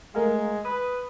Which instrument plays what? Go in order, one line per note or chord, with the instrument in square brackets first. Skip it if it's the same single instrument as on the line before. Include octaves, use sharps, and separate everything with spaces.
[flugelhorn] G#3 [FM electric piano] A3 A#4 F5
[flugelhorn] B4 [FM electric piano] D#6